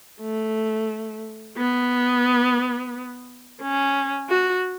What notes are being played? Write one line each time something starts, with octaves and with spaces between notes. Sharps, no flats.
A3
B3
C#4
F#4